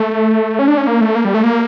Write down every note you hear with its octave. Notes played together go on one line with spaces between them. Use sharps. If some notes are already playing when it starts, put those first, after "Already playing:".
Already playing: A3
C#4
D4
C#4
A#3
A3
A#3
G3
A3
A#3